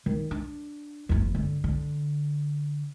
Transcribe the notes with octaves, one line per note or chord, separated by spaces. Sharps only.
D#3
D4
F#1 E2
D3
D3